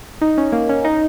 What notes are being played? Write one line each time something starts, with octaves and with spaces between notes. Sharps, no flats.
D#4
C#4
A#3
C#4
D#4